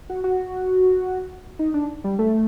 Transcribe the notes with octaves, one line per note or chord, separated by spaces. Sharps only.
F#4
F#4
D#4
D4
G3
A3